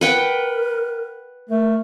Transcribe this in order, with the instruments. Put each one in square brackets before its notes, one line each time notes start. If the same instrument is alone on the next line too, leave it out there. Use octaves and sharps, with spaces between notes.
[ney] A#4 [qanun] B4 F#5 G5
[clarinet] A3 [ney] A#4